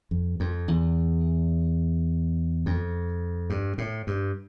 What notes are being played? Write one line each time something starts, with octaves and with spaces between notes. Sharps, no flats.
F2
F2
E2
F2
G2
A2
G2